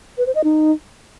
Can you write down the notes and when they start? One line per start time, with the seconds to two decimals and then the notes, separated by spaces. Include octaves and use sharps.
0.18 B4
0.26 C5
0.35 D#5
0.44 D#4